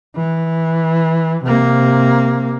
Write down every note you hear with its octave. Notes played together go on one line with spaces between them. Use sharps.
E3
C3 A#3